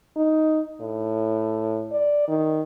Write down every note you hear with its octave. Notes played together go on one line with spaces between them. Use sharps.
D#4
A2
D5
D#3